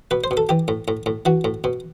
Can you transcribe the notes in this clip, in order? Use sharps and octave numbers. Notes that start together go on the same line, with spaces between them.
B2 B4
C5
B2
A4
E3 G4
A2
A2
A2
E3 F#4
A2
B2